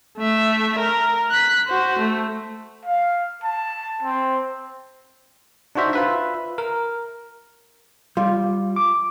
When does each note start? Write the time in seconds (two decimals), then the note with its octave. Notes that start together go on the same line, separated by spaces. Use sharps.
0.18 A3 E5
0.79 A#4
1.31 F#6 B6
1.67 F#4 C5
1.99 A3
2.86 F5
3.44 A5
4.03 C4
5.75 D4 D#4 F#4 C5 E5
5.93 F4 B4 E5
6.58 A#4
8.17 G3 F4
8.76 D6